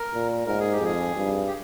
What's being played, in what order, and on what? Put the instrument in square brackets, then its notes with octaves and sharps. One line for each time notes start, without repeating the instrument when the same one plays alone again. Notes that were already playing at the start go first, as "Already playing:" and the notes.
Already playing: [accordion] A#4
[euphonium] A#2
[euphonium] G#2 [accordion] A#4
[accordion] G#4
G4
[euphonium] F2 [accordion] G#4
[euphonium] G2
[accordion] G4